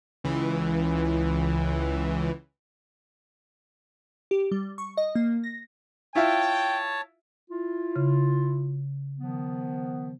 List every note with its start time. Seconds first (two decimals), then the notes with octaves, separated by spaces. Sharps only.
0.24 C#2 E3
4.31 G4
4.51 G3
4.78 C#6
4.97 D#5
5.15 A#3
5.44 A#6
6.15 E4 F4 C#5 E5 G5 A5
7.50 E4 F4
7.96 C#3
9.18 D#3 F3 B3